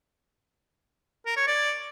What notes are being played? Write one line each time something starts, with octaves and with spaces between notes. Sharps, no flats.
A#4
C#5
D5